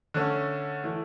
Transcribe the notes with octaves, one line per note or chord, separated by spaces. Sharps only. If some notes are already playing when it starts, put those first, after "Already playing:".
D3 A3 C#4
E3 A3